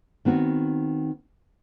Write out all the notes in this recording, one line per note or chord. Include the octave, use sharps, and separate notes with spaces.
D#3 B3 C4 F#4